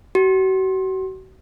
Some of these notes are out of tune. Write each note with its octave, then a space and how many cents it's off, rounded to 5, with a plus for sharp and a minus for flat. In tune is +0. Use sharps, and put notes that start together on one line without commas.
F#4 +40